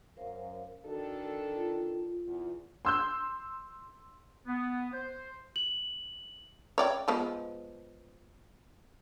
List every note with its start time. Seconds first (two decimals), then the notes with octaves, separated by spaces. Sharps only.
0.17 F#2 A#4 C5 F5
0.85 D#3 D4 F#4 A4
1.54 F4
2.27 E2
2.85 C6 E6 G6
4.47 B3
4.92 C5
5.56 F#7
6.78 C#5 D5 G5
7.08 F3 G#3 B3